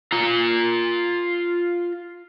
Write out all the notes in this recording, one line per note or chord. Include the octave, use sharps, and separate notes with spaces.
F4 A#5